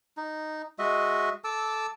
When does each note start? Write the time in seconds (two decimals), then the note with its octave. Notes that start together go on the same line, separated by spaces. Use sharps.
0.17 D#4
0.79 G#3 F#4 D#5 E5
1.44 A4 A5 D6 E6